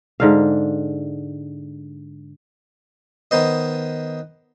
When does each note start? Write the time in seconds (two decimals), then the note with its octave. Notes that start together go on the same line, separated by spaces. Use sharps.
0.20 G#2 D3 F5
3.31 D#3 B3 C5 D#5